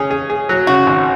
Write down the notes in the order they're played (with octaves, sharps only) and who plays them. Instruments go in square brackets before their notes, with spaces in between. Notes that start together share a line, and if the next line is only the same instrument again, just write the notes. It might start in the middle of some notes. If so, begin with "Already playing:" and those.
Already playing: [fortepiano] C#3 C#4 G#4
G#4
G#4
F#3
[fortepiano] C#3 [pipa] F#4
[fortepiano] G#1